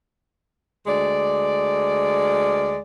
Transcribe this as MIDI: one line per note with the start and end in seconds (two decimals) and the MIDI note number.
0.87 2.78 38
0.87 2.78 56
0.87 2.78 74